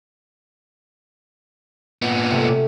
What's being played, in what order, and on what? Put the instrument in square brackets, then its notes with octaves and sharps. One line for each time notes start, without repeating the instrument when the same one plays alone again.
[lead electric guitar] A#2 B3
[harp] C3 A3 C#4